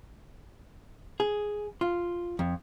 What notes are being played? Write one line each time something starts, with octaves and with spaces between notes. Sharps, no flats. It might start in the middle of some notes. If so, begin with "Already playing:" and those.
G#4
F4
F2